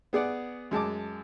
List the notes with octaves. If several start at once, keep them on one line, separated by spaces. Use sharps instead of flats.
B3 G#4 D5 F#5
F#2 G#3 A5 D6